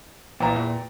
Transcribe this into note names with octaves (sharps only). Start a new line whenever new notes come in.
A#2 E3 F3 G5 A#5
E2